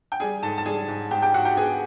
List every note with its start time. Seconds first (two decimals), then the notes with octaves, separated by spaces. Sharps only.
0.12 G5
0.20 G3 G#4 G#5
0.43 G#2 A4 A5
0.58 A5
0.66 G3 G#4 G#5
0.88 G#2
1.11 G#2 G4 G5
1.22 G4 G5
1.34 G#2 F#4 F#5
1.45 G4 G5
1.57 B3 G#4 G#5